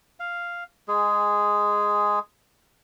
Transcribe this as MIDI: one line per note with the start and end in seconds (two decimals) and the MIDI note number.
0.20 0.64 77
0.88 2.19 56
0.88 2.19 68